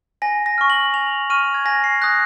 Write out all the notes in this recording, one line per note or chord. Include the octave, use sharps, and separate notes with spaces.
G#5 A#6
A#6
C#6 F6
F#7
G#5 F7
C#6 F6 D#7
G#6
G#5 A#6
C7
D#6 F#6 A#6